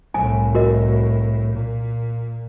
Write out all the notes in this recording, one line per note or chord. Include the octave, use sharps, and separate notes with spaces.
C2 A2 G#5
F#4 A#4 D#5
A#2